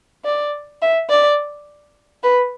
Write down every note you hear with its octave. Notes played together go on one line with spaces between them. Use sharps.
D5
E5
D5
B4